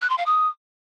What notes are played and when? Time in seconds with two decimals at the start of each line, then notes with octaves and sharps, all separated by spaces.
0.02 F#6
0.10 C6
0.18 F5
0.26 D#6